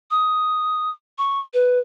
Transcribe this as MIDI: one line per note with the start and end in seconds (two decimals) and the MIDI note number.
0.11 0.90 87
1.18 1.40 85
1.54 1.79 71